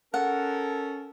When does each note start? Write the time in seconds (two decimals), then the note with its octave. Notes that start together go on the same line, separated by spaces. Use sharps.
0.14 C#4 A4 A#4 F#5